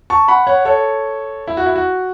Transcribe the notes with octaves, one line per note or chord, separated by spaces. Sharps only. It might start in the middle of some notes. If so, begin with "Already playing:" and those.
A5 C#6
F#5 B5
C#5 F#5
A4 C#5
E4
F#4
E4
F#4